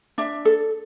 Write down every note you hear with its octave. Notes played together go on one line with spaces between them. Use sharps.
D4 E5
A4